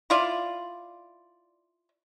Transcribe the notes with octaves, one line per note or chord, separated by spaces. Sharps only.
E4 F4 D5